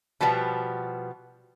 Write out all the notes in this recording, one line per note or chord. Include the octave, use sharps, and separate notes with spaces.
B2 F3 G3 B3